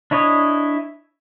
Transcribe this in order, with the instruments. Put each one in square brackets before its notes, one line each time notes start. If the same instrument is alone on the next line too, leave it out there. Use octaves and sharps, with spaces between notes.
[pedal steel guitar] D4 E4 C#5 D#5